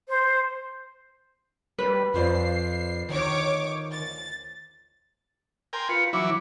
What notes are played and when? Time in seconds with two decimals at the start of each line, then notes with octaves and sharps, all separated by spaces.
0.09 C5
1.78 G3 B4
2.14 F2 F4 C5 D5 C7
3.09 D2 D#3 C#5 D6
3.91 A6
5.73 A#4 G5 G#5 C6
5.89 F4 B4 C#7
6.13 E3 F#3 E4 D6